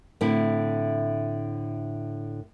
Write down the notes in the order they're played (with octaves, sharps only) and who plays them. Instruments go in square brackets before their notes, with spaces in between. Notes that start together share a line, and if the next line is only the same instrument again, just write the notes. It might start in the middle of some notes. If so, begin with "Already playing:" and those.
[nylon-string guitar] A2 D3 C4 E4